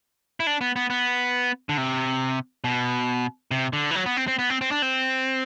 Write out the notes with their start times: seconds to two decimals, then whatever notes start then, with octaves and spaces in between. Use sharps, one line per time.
0.40 E4
0.47 D4
0.61 B3
0.76 B3
0.90 B3
1.69 D3
1.77 C3
2.64 B2
3.51 C3
3.73 D3
3.91 E3
3.95 F#3
4.06 B3
4.17 C4
4.28 C4
4.39 B3
4.50 C4
4.61 C4
4.71 D4
4.82 C4